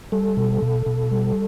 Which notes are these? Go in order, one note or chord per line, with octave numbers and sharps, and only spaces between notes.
G3 A4
B2
B2
B2
G3